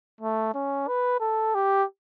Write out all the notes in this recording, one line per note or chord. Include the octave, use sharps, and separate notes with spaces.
A3
C#4
B4
A4
G4